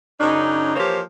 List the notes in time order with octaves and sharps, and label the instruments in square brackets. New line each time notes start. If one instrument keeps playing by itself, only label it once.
[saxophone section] F#2 C#3 D4 D#4
E3 F3 A#3 G4 C5 C#5